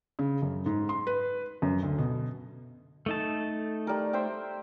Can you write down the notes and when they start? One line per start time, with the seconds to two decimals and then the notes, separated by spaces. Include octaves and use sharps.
0.19 C#3
0.42 F#2
0.66 G#2
0.89 C6
1.07 B4
1.62 F#2
1.83 D2
1.98 B2
3.06 A3 D#4 A5
3.87 G3 A#4
4.13 C5 E5 G5